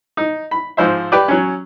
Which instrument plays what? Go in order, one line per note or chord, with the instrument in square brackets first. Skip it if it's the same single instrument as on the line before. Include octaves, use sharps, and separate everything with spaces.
[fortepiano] D#4
B5
G#2 F3 C5 E5
G4 B4 D5
F#3 C#4